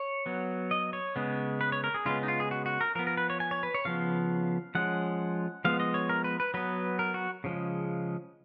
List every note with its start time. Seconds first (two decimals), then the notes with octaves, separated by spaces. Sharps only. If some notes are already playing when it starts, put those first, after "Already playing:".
Already playing: C#5
0.26 F#3 B3
0.71 D#5
0.93 C#5
1.16 C#3 G#3 B3
1.61 B4
1.72 C#5
1.84 A#4
1.94 G#4
2.05 C#3 G#3 B3 F4
2.23 D#4
2.28 F4
2.40 G#4
2.51 F#4
2.66 F#4
2.81 A#4
2.95 F3 A#4
2.99 B3
3.07 A#4
3.17 B4
3.30 C#5
3.40 G#5
3.51 C#5
3.63 B4
3.74 C#5
3.85 C#3 F3 B3 F5
4.75 F3 G#3 C#4 F#5
5.65 F3 G#3 B3 F5
5.80 D#5
5.94 C#5
6.09 A#4
6.24 B4
6.40 B4
6.54 F#3 B3 B4
6.99 A#4
7.14 F#4
7.44 C#3 F3 G#3